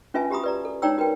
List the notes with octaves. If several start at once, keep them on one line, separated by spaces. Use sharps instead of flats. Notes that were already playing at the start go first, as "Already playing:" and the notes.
C#4 F4 B4 E5 G#5 A5
F#4 G4 A#5 B5 D#6
B4 D5 A#5
A4
D#4 C#5 D5 G5 A#5 E6
F#4 A#4 B4 G5